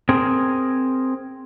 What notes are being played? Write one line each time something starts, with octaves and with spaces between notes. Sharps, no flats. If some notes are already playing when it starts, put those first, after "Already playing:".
C4 G#4 A#4